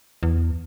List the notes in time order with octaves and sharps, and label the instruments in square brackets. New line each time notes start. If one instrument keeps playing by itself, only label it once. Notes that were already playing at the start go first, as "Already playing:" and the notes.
[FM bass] E2